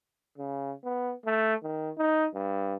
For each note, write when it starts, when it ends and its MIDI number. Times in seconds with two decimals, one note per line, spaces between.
0.38 0.74 49
0.85 1.14 59
1.26 1.55 57
1.63 1.90 51
1.98 2.27 63
2.34 2.76 43